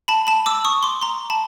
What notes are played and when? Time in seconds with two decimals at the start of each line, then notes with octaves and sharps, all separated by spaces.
0.08 A5 B5
0.27 A5 B5
0.46 D6 E6
0.64 C#6 D#6
0.83 C6 D6
1.01 A#5 C6
1.30 A5 B5